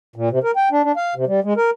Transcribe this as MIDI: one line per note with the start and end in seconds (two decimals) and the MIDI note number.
0.16 0.29 46
0.31 0.39 48
0.44 0.51 70
0.56 0.69 79
0.71 0.82 62
0.84 0.92 62
0.96 1.14 77
1.15 1.25 48
1.27 1.40 55
1.44 1.54 56
1.57 1.70 70